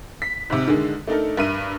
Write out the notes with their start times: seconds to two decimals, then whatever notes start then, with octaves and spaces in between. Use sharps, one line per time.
0.22 B6
0.50 G#2 C3
0.68 D3 D#3 G#3
1.07 A3 D4 D#4 A4 A#4
1.37 G2 A#4 E5 D#7